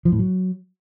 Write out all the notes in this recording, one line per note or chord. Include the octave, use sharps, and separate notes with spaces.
F3
A2
F#3